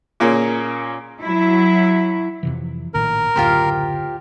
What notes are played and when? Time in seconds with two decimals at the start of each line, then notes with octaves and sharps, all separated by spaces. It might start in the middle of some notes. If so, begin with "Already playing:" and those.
0.20 A#2 A#3 C#4 G#4
1.21 F#3 E4
2.43 F2 C3 E3
2.94 A#1 A2 D#3 A#4
3.36 F#1 D2 A2 F4 G4 C5